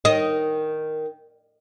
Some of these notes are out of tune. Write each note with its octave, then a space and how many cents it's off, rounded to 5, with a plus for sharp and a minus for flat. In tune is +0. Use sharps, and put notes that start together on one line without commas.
D#3 +0 D#5 +5